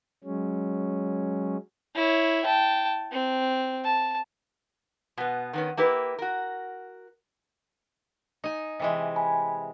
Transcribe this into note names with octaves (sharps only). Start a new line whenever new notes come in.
F#3 G#3 C#4
E4 C#5
G5 A5
C4
A5
B2 B3
D#3 B3 C#4
A#3 E4 G4 B4
F#4 A#4
D#4 G#5
C3 E3 G#3
G#5 B5